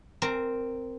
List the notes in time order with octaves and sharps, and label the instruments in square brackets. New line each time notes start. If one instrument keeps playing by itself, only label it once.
[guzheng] C4 A#4